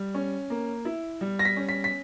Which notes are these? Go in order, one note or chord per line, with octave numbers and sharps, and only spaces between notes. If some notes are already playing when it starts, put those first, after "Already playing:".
Already playing: G3
C#4
A#3
E4
G3
A#6
B6
C#4
B6
B6